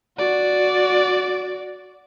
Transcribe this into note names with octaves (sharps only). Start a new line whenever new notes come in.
F#4 D5